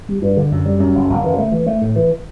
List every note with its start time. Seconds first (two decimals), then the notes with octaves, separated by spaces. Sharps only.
0.08 G3
0.22 G2
0.37 D3
0.52 F#2
0.66 G3
0.80 F#2
0.95 F#1
1.09 F#1
1.24 E3
1.38 A3
1.52 E3
1.67 A3
1.81 A2
1.96 E3